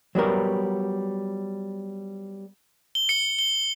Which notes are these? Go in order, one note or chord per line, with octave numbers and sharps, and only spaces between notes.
F#3 G3 B3 A#4
G7
C#7
G7